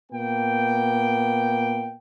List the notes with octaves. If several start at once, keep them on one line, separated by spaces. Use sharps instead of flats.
A#2 A#3 B3 G5